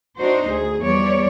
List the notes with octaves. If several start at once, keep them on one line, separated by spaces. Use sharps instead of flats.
D4 D#4 F#4 C5
D2 G#4
E2 F3 G3 C#5 D5